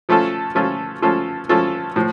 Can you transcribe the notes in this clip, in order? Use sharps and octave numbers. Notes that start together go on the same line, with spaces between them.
F3 A3 C#4 F4 A4
F3 A3 C#4 F4 A4
F3 A3 C#4 F4 A4
F3 A3 C#4 F4 A4
A2 F3